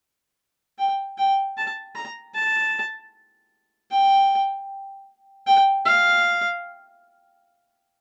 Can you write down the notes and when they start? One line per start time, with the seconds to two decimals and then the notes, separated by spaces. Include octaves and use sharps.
0.79 G5
1.18 G5
1.57 A5
1.95 A#5
2.35 A5
3.91 G5
5.46 G5
5.85 F5